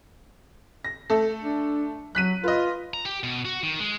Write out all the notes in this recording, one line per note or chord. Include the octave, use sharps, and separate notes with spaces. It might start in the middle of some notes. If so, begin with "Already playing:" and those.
A#6
A3 A4
D4
F#3 F#6 B6 D#7
F4 B4 D#5
A#5
G4
B2
F#4
D#3
G#3